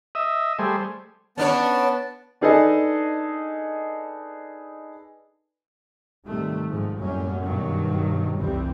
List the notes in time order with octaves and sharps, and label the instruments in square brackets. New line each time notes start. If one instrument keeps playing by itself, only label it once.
[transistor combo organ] D#5 E5
G3 A3 G#4 C5
[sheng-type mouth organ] B3 A5 [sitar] C#4 D4 C#5
[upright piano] D4 D#4 G#4 A4 B4 D#5
[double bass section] G#2 C3 D#3 G3 A3
G#2 F3
F#2 A2 F#3 G3 A#3 C#4
G2 B2 D#3 F#3
F1 C2 G2 E3 G3 C4